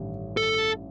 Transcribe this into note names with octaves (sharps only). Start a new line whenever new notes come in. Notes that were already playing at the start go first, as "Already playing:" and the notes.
Already playing: A1 G2 D#3 G3
A4